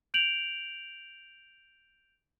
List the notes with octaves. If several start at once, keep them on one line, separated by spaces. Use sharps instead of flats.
G6 D7 F7 F#7